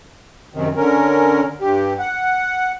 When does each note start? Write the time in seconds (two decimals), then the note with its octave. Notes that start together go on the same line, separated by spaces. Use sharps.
0.54 F#2 C3 D#3
0.77 D3 C#4 A#4
1.61 G2 G4
1.99 F#5